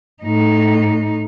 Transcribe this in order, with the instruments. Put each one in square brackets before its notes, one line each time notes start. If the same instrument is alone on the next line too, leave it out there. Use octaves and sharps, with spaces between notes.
[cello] A2 D#4